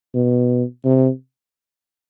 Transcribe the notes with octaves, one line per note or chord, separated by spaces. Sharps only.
B2
C3